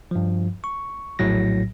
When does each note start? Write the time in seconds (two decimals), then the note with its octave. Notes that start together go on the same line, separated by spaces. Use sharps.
0.11 G2 F3
0.64 C#6
1.19 A#1 A2 F#3 A#6